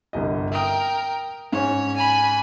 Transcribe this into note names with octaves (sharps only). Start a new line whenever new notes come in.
G1 C2 D#5
A#4 E5 G5 D#6
G#2 C#4 C#5
G#5 B5